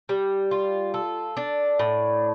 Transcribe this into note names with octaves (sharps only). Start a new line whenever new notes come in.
G3
F4
A4
D4
A2